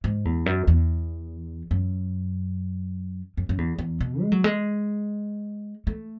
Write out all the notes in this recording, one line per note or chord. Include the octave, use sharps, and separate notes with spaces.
G#2
E2
F#2
E2
F#2
F#2
F#2
E2
E2
B2
G#3
F#3
G#3
A3